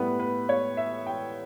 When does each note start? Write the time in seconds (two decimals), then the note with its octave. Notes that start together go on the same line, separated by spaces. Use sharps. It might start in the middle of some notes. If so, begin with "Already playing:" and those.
Already playing: A2 G3 B3 B4
0.20 B4
0.49 C#5
0.77 E5
1.07 G5